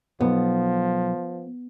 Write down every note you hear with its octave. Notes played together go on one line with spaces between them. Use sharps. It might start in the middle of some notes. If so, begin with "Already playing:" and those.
B1 F3 B3